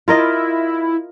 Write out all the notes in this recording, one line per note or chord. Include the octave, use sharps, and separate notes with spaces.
E4 F4 A#4 D#5